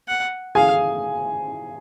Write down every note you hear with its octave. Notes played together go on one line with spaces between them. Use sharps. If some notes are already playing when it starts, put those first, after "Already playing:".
F#5
G#4 F5 G#5